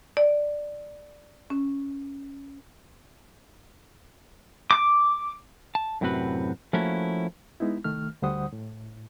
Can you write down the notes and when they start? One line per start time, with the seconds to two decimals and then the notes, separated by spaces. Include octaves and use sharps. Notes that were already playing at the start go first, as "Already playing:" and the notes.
0.17 D5
1.50 C#4
4.71 D6
5.75 A5
6.01 F#2 A2 C3 C4 F#4 B4
6.73 F3 A3 A#3 C#4 E4 F#4
7.60 G#3 B3 D#4 E4
7.84 C2 D#3 A3 F6
8.22 D2 D3 G3 C5 F#5 D#6
8.53 A2